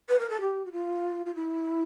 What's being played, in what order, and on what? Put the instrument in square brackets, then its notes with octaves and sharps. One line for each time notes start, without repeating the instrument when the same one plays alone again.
[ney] B4
A#4
A4
G4
F#4
F4
F4
E4